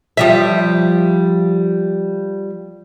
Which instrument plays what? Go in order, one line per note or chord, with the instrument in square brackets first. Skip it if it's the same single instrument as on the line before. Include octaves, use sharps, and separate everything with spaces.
[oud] F3 G3 E5